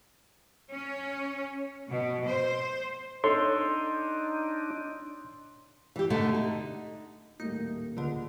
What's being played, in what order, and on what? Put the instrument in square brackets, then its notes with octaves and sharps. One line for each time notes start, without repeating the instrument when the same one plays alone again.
[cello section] C#4
B2
C5
[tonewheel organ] D4 D#4 [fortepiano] A4 C#5 [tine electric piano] C6
[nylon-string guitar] E3 G4
B2 D3 A3 B3 D#4 G4
D#4
[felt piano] D#1 A2 A#3 [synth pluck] D#4
[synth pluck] C#2 G#2 D3